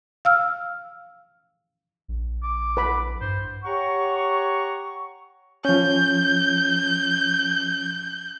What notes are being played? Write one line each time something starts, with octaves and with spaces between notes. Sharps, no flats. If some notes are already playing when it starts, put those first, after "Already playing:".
F5 E6 F6
A#1
D6
B4 B5
G2 C5
G4 C#5 F#5 A#5 C#6
F3 C#4 G6